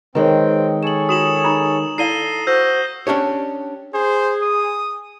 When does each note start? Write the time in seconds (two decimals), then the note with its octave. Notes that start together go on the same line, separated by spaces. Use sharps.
0.15 D#3 G#3 C4 B4 C#5 G5
0.83 G#4 A4 C#5 E7 F#7
1.09 F4 F#4 D#6 E7 F#7
1.44 D#4 A#5 B5
1.98 E4 A4 D5 F5 A#5 C7 D#7 G7
2.47 F#4 C5 E6 G6 A#6
3.07 C#4 D4 G4 C#5
3.94 G#4 C5
4.42 D#6